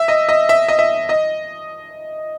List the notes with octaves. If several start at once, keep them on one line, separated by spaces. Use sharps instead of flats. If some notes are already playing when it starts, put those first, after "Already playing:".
Already playing: E5
D#5
D#5
E5
D#5
E5
D#5